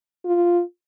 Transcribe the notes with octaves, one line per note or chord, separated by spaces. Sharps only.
F4